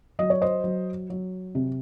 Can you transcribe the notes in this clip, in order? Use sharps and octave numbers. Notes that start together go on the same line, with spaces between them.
F#3 D#5
C#5
C5 D#5
F#3
F#3
C3